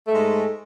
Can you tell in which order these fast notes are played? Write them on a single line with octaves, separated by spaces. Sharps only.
A3 G#2 G#3